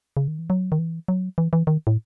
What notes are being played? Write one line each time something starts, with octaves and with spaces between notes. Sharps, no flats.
C#3
D#3
E3
F#3
D#3
E3
F#3
E3
E3
D#3
A2